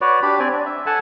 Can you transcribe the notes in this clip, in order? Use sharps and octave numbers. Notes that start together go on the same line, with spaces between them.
F#4 B4 C#5 D5
D4 G4 B5
C4 D5 G#5
D4
E5
A4 F#5 G#5 A5